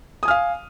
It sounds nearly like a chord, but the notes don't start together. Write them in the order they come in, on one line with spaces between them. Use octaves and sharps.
D#6 G#5 F6 F5